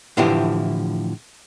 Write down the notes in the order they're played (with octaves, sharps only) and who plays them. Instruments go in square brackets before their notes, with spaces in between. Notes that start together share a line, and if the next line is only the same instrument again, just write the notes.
[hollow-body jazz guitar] A2 D3 E3 F3 E4 G4